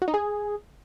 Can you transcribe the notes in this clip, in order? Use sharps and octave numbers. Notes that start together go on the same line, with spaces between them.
F#4
D#4
G#4